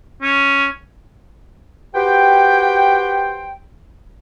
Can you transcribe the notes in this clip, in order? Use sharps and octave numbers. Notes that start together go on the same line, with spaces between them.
C#4
F#4 G4 B4 C5 G5